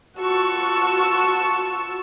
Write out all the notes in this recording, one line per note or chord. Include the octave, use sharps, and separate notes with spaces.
F4 F#4 A5 C#6 E6